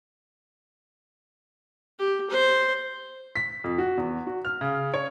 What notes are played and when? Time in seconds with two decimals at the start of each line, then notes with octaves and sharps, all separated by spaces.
1.99 G4
2.30 C5
3.36 B6
3.64 F2
3.78 F#4
3.98 E2
4.27 F#4
4.45 F6
4.61 C#3
4.94 C#5